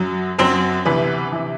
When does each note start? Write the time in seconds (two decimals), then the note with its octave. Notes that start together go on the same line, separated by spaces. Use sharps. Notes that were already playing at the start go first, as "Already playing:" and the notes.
Already playing: F#2 F#3
0.38 F#2 F#3 C4 C5
0.85 D2 C3 E3 B3 B4
1.32 C3 E3